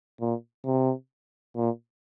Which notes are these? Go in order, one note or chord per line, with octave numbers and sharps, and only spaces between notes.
A#2
C3
A#2